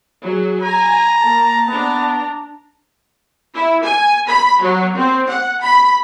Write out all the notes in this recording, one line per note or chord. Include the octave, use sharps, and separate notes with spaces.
F#3 G#4
G#5 A#5
A#3 A5
B3 D4 A#5
E4
G#5
B5
F#3
C4
F#5
B5